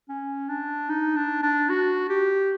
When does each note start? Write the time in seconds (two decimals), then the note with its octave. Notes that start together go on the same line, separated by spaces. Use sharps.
0.09 C#4
0.49 D4
0.89 D#4
1.16 D4
1.43 D4
1.70 F#4
2.09 G4